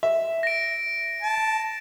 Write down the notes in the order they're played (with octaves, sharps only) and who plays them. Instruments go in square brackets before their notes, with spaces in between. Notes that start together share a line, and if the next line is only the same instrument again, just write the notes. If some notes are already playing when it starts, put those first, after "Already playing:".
[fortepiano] E5
[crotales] A#6 D7
[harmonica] A5